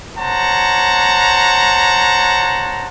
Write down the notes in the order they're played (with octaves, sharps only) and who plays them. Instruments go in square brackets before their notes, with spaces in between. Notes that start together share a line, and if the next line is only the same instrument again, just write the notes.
[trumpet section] C5 C#5 F#5 A5 A#5